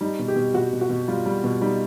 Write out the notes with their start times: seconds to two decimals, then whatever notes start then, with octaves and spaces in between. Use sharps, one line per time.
0.01 G3 D#4
0.19 B2
0.28 G4
0.36 B2
0.54 B2 F#4
0.72 B2
0.81 F#4
0.90 B2
1.08 G3 F4
1.26 G3
1.44 B2
1.61 G3 D#4